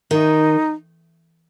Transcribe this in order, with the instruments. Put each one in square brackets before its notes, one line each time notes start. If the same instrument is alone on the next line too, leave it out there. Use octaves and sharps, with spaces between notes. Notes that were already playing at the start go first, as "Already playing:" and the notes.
[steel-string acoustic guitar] D#3 [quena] D#4